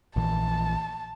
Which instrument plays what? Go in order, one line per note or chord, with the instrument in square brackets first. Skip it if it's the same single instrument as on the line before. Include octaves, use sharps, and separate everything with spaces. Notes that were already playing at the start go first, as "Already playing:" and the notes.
[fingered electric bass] A#1 A#2 E3 [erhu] A5